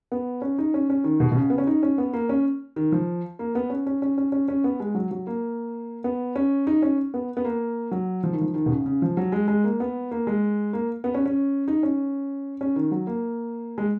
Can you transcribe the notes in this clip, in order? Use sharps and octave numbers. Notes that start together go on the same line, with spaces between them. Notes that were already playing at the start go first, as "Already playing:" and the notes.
B3
C#4
D#4
C#4
C#4
D#3
B2
B2
C#3
B3
C#4
D#4
C#4
B3
A#3
C#4
D#3
F3
A#3
B3
C#4
C#4
C#4
C#4
C#4
C#4
B3
G#3
F#3
F#3
A#3
B3
C#4
D#4
C#4
B3
B3
A#3
F#3
F3
D#3
F3
D#3
B2
C#3
C#3
F3
F#3
G#3
G#3
A#3
B3
A#3
G#3
A#3
B3
C#4
C#4
D#4
C#4
C#4
D#3
F#3
A#3
G#3